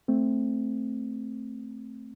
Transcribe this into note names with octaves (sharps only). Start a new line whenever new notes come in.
A3 C4